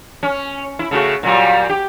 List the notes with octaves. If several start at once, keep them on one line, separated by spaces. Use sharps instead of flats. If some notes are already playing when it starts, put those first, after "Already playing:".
C#4
E4
C#3 A3 F#4
A#2 F#3 G3
G4